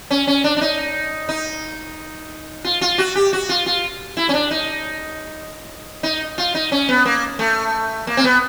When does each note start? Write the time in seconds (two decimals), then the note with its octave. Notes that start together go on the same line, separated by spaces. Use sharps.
0.11 C#4
0.27 C#4
0.44 D4
0.57 D4
0.61 D#4
1.29 D#4
2.65 F4
2.81 F4
2.98 F#4
3.15 G4
3.33 F#4
3.49 F4
3.66 F4
4.17 E4
4.29 C#4
4.34 D4
4.51 D#4
6.03 D#4
6.38 F4
6.55 D#4
6.72 C#4
6.89 B3
7.05 A#3
7.39 A3
8.07 A#3
8.17 C4
8.24 B3